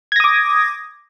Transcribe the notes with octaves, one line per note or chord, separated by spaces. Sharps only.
D6 D#6 G#6 A#6